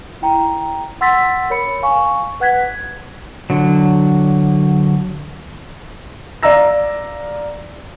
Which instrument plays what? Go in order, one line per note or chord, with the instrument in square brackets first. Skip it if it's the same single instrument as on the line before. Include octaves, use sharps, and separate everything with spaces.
[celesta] E4 G5 A#5
F#5 C6 E6 A6 B6
A#4 C#5 B5 C#7
F5 G#5 C#6
B4 F#5 F#6 G#6 B6
[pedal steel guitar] D3 F#3
[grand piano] D5 F5 A#5 E6 A#6